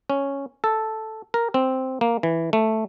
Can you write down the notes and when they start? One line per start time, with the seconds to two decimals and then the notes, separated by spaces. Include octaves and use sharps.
0.10 C#4
0.64 A4
1.34 A#4
1.54 C4
2.01 A#3
2.23 E3
2.53 A3